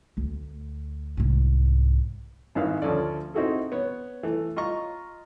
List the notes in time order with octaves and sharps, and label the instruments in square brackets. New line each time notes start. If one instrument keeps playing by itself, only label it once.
[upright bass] D2
C2 G#2
[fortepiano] G#1 G2 D#3 E4 B4 F5
D2 F3 C#4 A4 D5
C4 D#4 E4 F#4 G#4 A4
B3 C#5
E3 A3
F4 D#5 A#5 C#6